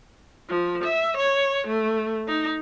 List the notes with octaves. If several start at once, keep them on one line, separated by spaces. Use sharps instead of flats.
F3
E5
C#5
A3
D#4